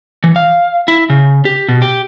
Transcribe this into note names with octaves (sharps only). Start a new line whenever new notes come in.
E3
F5
E4
C#3
G4
B2
G4